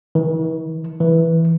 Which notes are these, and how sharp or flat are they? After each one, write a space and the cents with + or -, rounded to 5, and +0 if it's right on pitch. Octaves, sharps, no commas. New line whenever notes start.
E3 -45
E3 -5